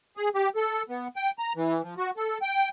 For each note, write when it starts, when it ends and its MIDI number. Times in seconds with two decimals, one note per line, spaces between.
0.17 0.29 68
0.35 0.49 67
0.56 0.83 69
0.89 1.08 59
1.16 1.31 79
1.39 1.53 82
1.56 1.82 52
1.82 1.95 53
1.98 2.11 66
2.17 2.38 69
2.42 2.69 79